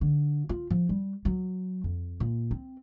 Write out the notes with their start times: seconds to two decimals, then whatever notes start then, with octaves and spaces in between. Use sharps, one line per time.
0.01 D3
0.49 F4
0.70 F3
0.89 G3
1.25 F#3
1.84 F2
2.20 A#2
2.51 C4